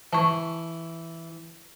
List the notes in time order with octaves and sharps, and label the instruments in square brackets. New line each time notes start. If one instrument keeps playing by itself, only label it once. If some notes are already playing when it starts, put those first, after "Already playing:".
[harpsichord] E3 [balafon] A5 C#6